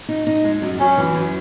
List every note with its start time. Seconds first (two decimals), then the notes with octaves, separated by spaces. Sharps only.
0.09 D#4
0.27 D#4
0.44 G#3
0.62 F#2
0.80 F#2 C#4
0.97 E3
1.15 F#2